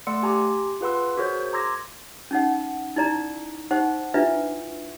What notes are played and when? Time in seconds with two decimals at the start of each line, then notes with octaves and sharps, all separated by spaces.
0.07 A3 D5 F#5 C6 E6 C#7
0.23 G4 G#5 A#5 C6 D6
0.81 F4 G#4 B4 F#5 C6 E6
1.17 F#4 G#4 A#4 C5 C#5 G6
1.53 A#5 C6 D6 E6 G#6 A#6
2.31 C#4 D#4 F#5
2.96 D#4 E4 D5 A#5
3.71 D#4 C5 F#5 C#6
4.14 D4 E4 F4 B4 E5